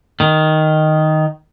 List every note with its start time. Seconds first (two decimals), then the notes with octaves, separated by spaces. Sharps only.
0.20 D#3